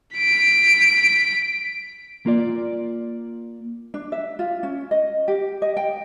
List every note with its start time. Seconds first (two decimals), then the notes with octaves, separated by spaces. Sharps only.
0.17 B6 D7
2.26 A#3 F4 D5
3.94 D4
4.12 E5
4.39 F4
4.63 C#4
4.91 D#5
5.28 G4
5.62 D#5
5.77 G5